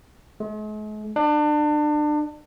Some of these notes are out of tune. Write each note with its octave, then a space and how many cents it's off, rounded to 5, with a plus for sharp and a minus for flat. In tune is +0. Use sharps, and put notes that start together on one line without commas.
G#3 +45
D4 +30